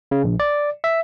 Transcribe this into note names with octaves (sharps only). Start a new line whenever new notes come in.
C#3
A#1
D5
E5